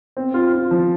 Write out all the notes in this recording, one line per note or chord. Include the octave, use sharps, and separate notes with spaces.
C4
F4
F4
F3